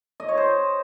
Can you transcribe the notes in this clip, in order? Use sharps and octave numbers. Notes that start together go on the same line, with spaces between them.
D#5
C#5
C5